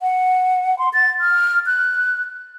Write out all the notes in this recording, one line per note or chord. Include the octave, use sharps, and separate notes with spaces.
F#5
C6
A6
F6
F#6